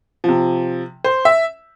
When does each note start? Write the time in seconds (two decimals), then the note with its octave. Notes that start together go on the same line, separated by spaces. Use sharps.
0.24 C3 F3
1.04 C5
1.25 E5